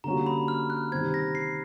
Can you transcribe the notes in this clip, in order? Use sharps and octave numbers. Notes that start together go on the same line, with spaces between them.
D3 G3 A#3 C#4 F#4 A#5
B5
F6
F#6
C3 D#3 G3 C4 G#6
A#6
C7